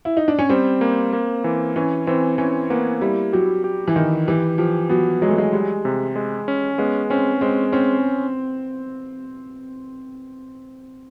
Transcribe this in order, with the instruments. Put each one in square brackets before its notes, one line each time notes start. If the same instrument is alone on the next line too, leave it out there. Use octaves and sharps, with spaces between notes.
[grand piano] E4
D#4
D4
C#4
[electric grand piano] G3 [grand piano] C4
[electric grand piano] A#3
A#3
E3
[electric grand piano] E3 [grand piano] C#4
[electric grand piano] E3 [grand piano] C4
[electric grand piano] E3 [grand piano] C#4
[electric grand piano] A#3 [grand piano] B3
[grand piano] G3 [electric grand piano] E4
[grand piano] F#3 [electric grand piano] G4
[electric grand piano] G4
[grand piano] E3
[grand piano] D#3 [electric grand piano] E4
[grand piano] E3 [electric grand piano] G4
[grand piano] F3 [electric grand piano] G4
[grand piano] F#3 [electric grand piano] B3
[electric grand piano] F#3 [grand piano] G#3
[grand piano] A3
G#3
[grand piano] G3 [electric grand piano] G#3
[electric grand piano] C3
G#3
C#4
[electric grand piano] G#3 [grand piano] B3
[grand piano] C4 [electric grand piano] C#4
[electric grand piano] G#3 [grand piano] C4
[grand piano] C4 [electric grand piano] C#4